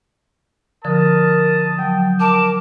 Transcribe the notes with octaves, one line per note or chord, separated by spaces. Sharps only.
D3 F3 A#4 A5 D#6
F#3 G5
A#4 A5 D6